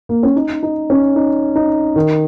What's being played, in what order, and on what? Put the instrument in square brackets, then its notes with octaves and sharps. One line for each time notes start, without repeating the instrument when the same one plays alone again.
[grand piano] A#3
C#4
D#4
D#4
C#4
D#4
D#4
D#3